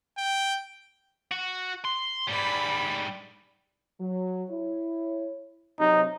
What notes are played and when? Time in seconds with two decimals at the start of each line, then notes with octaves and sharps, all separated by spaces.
0.17 G5
1.32 F#4
1.85 C6
2.28 G#2 G3 D5 B5
4.00 F#3
4.50 E4 C#5
5.80 C3 F#3 D#4